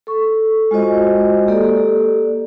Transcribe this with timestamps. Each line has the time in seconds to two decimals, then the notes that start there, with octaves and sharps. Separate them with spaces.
0.07 A4 C#6
0.71 G#3 F4 F#4 C5 D#5
1.47 A#3 G4 A4 D5